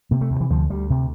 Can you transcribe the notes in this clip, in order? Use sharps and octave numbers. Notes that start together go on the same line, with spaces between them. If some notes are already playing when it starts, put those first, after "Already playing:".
C3 A#3
A3
D2
E3
D2 F3
D2 G3
C3